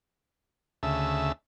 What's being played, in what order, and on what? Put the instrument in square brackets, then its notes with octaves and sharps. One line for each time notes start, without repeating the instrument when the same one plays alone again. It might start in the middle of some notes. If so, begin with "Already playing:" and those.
[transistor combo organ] D2 C#3 E5 A5